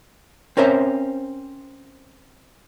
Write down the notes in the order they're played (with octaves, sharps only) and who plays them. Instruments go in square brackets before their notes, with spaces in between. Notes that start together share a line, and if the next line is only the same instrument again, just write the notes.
[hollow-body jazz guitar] C4 C#4 A#4 C5 E5